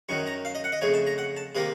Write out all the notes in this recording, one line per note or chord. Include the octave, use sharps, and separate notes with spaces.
F#2 D#3 F#3 C#6
A#5
F5
D#5
F#5
D#5
F2 C#3 A3 C#5
A5
A#5
F#5
A5
C3 D#3 A#3 D#6